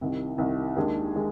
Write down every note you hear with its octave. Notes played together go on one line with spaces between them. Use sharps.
C2 C3 D#3
C2 C3 D#3
D#2 D#3 G#3 D4 G#4
D#3 G#3